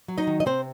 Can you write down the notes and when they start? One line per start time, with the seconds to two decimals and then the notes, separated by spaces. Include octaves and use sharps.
0.08 F#3
0.18 D#4 D#5
0.27 D#3
0.40 D#5
0.46 C3 C4 C5